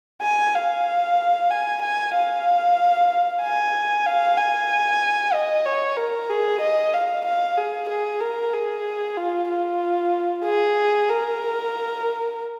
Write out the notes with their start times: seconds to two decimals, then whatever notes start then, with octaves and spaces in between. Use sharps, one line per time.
0.22 G#5
0.55 F5
1.51 G#5
1.82 G#5
2.15 F5
3.43 G#5
4.06 F5
4.37 G#5
5.34 D#5
5.66 C#5
5.97 A#4
6.30 G#4
6.61 D#5
6.94 F5
7.25 F5
7.58 G#4
7.89 G#4
8.21 A#4
8.54 G#4
9.17 F4
9.49 F4
10.44 G#4
11.09 A#4